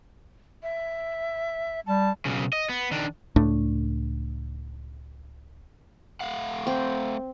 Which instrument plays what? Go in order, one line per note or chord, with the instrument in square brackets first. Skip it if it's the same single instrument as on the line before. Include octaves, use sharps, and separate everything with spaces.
[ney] E5
[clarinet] G3 [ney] A5
[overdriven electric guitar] B1 C#3
D#5
B3
D#3 D4
[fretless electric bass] C#2 A2 A3 D4
[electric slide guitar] A3 F5 F#5
[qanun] C4